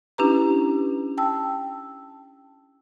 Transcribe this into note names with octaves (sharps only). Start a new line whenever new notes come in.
C#4 D4 E4 G4 B4 A#5
G5 A5 E6